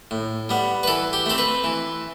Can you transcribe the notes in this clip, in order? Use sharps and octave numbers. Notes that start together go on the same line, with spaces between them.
A2
G3 B3
B4
E3 A4
G4
A3 C4 A4
B4
E3